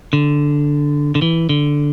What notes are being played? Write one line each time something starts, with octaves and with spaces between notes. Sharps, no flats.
D3
D3
E3
D3